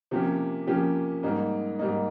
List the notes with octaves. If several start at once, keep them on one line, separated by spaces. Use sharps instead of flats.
C3 F3 A#3 C#4 G4
C3 F3 A#3 C#4 G4
G#2 G3 A#3 D#4
G#2 G3 A#3 D#4